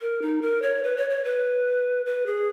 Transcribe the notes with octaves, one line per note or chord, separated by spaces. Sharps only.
A#4
D#4
A#4
C#5
B4
C#5
C#5
B4
B4
G#4